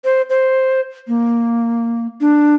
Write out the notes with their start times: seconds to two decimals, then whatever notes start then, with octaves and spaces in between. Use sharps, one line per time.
0.05 C5
0.30 C5
1.08 A#3
2.21 D4